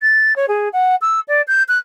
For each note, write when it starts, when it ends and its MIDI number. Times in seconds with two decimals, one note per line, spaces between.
0.02 0.36 93
0.36 0.46 73
0.48 0.69 68
0.73 0.95 78
1.01 1.20 88
1.28 1.41 74
1.47 1.63 91
1.68 1.78 90